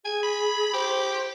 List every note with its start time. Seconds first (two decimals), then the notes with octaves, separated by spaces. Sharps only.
0.05 G#4 G#5
0.23 B5
0.73 G4 C5